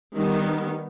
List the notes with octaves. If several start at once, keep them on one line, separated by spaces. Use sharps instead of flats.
D#3 G3 B3